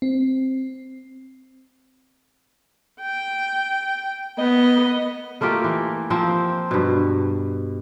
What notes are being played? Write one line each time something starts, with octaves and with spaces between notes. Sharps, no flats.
C4
G5
B3 D#5
A3 A#3 F4 G4
E3
F3 A#3 C4
G2 B2